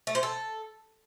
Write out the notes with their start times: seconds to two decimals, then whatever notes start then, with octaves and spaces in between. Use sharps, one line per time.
0.07 A3
0.15 C5
0.23 A4